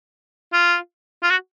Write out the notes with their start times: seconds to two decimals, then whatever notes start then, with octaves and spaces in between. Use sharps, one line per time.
0.53 F4
1.23 F4
1.30 F#4